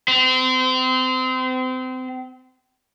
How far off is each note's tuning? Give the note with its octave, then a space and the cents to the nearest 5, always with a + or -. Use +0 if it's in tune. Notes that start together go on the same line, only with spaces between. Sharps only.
C4 -30